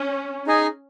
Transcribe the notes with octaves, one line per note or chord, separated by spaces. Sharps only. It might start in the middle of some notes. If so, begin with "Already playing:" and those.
Already playing: C#4
D#4 G#4 D#5 G#5